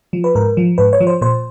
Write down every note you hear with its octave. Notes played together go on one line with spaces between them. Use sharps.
F3
B4
G#2 A#4
F3
G#2 B4
C#5
F3
C5
A#2 C5